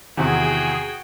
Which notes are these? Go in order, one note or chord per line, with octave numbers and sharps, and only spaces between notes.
E2 C3 D#3 C4 F#4 G#4 G5